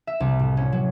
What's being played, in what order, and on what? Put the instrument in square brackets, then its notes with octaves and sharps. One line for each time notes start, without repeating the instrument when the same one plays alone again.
[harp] E5
C2
A2
C#4
F#3